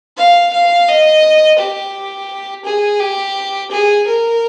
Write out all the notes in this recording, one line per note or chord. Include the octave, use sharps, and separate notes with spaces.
F5
F5
D#5
G4
G#4
G4
G#4
A#4